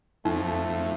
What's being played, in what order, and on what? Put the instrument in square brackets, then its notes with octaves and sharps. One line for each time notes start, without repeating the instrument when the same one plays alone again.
[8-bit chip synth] F2 [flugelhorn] A3 [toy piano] D#4